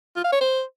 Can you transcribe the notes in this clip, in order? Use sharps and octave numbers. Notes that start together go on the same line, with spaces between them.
F4
F5
C#5
C5